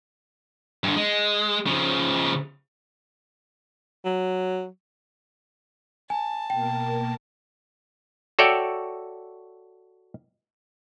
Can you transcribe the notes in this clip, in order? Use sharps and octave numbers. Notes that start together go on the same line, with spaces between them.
G2 D3
G#3
C#3 F3
F#3
G#5 A5
B2 A#3 A#4 G5
F#4 A4 C#5 D5 E5 G5